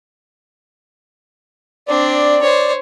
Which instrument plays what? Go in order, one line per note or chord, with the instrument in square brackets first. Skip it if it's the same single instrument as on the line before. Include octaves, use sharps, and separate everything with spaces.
[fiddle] C4 D4 [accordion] D5
[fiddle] C5 C#5